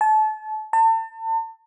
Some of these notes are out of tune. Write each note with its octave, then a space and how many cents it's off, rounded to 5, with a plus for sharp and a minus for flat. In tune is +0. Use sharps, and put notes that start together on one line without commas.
A5 -30
A5 +35